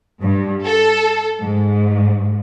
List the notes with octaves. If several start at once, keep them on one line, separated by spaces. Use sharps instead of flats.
G2
A4
G#2